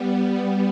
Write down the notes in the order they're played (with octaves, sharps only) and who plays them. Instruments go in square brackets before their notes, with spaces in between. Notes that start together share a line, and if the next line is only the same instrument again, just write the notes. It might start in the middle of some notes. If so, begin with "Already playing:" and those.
Already playing: [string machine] G3 B3
G3